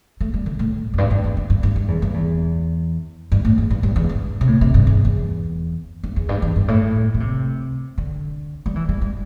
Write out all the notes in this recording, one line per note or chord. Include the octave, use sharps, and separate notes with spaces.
A3
G3
D3
A2
E2
G2
G2
E2
G2
G2
G2
G2
E2
G2
E2
G2
A2
E2
G2
G2
E2
G2
C3
A2
C3
G2
E2
E2
G2
E2
G2
E2
G2
A2
D3
C3
D3
G3
E3
G3
G3